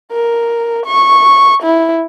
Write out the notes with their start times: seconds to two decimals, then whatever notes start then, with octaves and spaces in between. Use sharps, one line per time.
0.12 A#4
0.86 C#6
1.63 E4